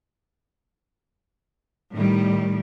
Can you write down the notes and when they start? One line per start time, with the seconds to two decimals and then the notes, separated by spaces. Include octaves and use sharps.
1.94 A2 D#3 G3